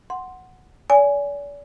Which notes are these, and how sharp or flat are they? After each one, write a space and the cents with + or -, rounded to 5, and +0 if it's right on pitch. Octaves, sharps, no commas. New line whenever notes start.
F#5 +0 C6 +0
D5 -40 G#5 +0